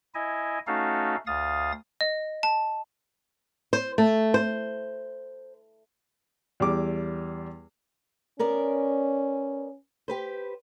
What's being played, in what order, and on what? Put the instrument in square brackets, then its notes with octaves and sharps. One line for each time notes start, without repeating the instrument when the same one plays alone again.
[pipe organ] E4 D#5 G#5
A3 C#4 D#4 F#4 A4 F5
D2 F5 D#6 A6
[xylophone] D#5
A5
[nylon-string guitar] C5
A3
C5
[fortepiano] E2 G3 D6
[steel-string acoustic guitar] B3 A#4 D5 [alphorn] C#4
[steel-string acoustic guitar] G4 B4 C5